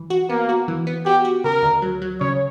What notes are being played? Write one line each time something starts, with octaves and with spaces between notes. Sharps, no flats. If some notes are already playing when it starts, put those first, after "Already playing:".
Already playing: E3
F#4
A#3 B3
F#4
E3
B3
F#4 G4
F#4
C#3 A#4
D2
F#3
F#3
C#3 C#5